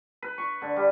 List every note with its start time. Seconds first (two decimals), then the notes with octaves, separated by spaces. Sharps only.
0.22 B4
0.38 C#6
0.62 D3
0.76 G3